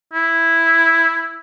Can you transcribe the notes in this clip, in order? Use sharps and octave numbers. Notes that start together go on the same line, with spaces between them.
E4